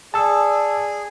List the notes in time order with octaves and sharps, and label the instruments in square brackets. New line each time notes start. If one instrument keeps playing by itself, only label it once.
[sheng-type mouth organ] G#4 [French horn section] D5 [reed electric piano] A5 E6